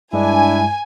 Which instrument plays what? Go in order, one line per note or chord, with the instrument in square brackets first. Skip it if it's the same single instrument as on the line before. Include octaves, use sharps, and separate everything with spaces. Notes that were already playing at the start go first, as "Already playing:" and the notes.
[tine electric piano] G2 G#3 [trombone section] D4 E4 [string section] G#5